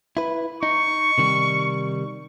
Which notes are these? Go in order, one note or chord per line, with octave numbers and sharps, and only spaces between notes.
E4 B4
D#4 C#6
C3 D#3 G3